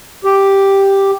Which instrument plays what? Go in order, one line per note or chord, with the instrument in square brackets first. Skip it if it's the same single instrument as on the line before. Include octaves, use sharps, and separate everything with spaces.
[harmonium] G4